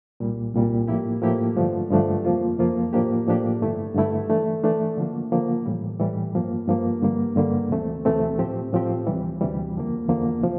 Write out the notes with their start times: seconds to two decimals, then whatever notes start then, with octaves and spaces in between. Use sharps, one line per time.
0.20 C2 A#2 G3
0.53 C2 A#2 G3
0.87 A2 F3 A#3 E4 G4
1.22 A2 F3 A#3 E4 G4
1.56 G2 D3 F3 A3 D4
1.90 G2 D3 F3 A3 D4
2.24 F2 C3 F3 A#3 F4
2.58 F2 C3 F3 A#3 F4
2.93 A2 F3 A#3 D4 G4
3.27 A2 F3 A#3 D4 G4
3.61 G2 D3 A3 E4
3.94 G2 D3 A3 E4
4.30 E3 A3 D4
4.63 E3 A3 D4
4.97 D3 F3 A#3
5.32 D3 F3 A#3
5.66 A2 E3 G3
5.99 A2 E3 G3
6.34 G2 F3 A#3
6.67 G2 F3 A#3
7.02 G2 D3 G3 A#3
7.36 G2 D3 G3 A#3
7.71 D2 C3 E3 A3 C4
8.05 D2 C3 E3 A3 C4
8.38 A2 F3 C4 G4
8.73 A2 F3 C4 G4
9.07 D2 C3 E3 G3
9.41 D2 C3 E3 G3
9.76 E2 D3 F3 A#3
10.09 E2 D3 F3 A#3
10.43 C3 F3